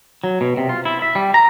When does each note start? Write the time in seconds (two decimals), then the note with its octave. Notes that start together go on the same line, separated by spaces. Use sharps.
0.24 F#3
0.41 B2
0.57 C3
0.69 F4
0.85 E4
1.02 E5
1.15 G3
1.34 A#5